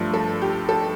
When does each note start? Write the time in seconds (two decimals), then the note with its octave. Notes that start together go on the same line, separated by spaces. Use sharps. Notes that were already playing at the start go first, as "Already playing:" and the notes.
Already playing: G2 F3 A3 D4 F4
0.14 A4
0.42 G4
0.69 A4